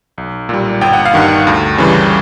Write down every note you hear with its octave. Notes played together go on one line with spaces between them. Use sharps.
B1
A#2 G3
G1 G5
F#5
F5
G2 D#3 F#5
D2
C#3 E3 G3